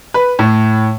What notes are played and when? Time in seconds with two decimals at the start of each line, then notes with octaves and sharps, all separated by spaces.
0.14 B4
0.39 A2